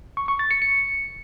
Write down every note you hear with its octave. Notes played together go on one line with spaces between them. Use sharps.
C#6
C#6
A6
C#7
C#7